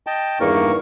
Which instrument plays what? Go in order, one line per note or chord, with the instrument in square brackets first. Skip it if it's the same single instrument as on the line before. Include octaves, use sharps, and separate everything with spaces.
[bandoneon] D#5 G5 A5
[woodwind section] E2 D#3 C#6 [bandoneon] G2 A#3 A#4